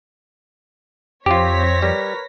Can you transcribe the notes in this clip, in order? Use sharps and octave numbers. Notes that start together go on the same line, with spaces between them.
F2 C4 F4 G4 C5 C#5 A#6 B6
G3 A#4 B4